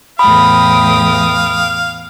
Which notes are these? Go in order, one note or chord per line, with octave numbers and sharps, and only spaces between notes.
E2 A2 F5 G5 B5 D#6